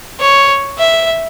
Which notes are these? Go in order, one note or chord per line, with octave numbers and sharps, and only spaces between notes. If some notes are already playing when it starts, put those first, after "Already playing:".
C#5
E5